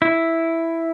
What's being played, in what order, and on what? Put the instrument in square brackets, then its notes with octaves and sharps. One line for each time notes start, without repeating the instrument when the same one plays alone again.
[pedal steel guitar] E4